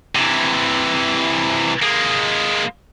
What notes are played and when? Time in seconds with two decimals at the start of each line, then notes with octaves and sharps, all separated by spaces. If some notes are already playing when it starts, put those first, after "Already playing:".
0.16 C3 E3
1.82 G#3 A#3